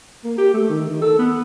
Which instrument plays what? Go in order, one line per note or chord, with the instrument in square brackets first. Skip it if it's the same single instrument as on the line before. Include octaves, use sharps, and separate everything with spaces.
[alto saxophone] A#3
G4
A3
D#3
D#3
A4
B3